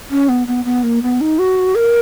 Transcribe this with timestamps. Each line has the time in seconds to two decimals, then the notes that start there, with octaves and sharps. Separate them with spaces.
0.11 C#4
0.29 B3
0.47 B3
0.65 B3
0.83 A#3
1.03 B3
1.21 D#4
1.39 F#4
1.75 A#4